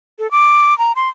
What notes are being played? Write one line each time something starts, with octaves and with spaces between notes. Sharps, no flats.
A4
D6
A#5
C6